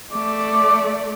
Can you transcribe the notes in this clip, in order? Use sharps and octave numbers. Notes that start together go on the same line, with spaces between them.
A3 D5 D6